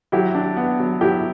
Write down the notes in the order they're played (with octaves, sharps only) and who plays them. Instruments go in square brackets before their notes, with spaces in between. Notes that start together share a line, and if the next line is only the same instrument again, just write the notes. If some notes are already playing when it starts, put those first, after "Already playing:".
[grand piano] F#3 [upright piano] E4 G4
[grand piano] D4
B3
F#3
[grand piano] F#3 [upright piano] E4 G4